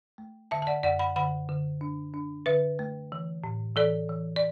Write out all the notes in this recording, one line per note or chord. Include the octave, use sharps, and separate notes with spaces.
A3
D3 E5 A5
A5
D5 F#5
F#2 D5 F#5
F#5 B5
D3 F#5 B5
D3
D4
D4
D3 B4 E5
A3
E3
A2
E3 A4 D5
E3
D5